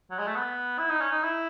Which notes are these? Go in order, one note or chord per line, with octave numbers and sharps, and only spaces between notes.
F#3
G#3
A3
B3
E4
D#4
C#4
D#4
E4